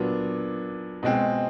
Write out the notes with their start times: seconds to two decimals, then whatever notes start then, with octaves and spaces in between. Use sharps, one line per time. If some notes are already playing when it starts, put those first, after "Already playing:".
Already playing: A#2 F#3 B3 D4
1.03 B2 G#3 C4